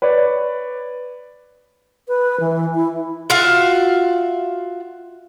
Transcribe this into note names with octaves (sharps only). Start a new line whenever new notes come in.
B4 C#5 D5
B4
E3
E4
F4 F#4 E5 F5